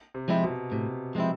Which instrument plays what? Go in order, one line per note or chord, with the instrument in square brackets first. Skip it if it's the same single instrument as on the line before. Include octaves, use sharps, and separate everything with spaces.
[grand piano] C3
[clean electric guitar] F3 G#3 C4 E4
[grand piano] B2
[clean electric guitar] A2 [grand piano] C3
[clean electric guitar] F3 G#3 C4 E4